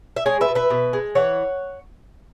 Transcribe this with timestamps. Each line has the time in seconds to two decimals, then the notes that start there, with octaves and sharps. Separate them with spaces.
0.16 E5
0.26 G#3 G#4 C#5
0.41 B4 E5
0.48 B2
0.55 B4 E5
0.70 B2
0.93 G#3
1.15 E3 C#5 F#5